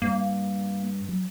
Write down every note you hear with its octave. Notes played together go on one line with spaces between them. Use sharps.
G2 A#3
F#3